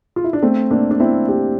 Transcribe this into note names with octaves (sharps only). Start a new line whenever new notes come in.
F4
E4
D4
A3 C4
A#3 D4
D4
C4 E4
E4 G4